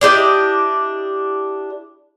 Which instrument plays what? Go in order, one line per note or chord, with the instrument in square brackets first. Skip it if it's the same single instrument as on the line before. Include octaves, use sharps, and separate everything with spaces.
[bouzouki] D4 E4 G4 D#5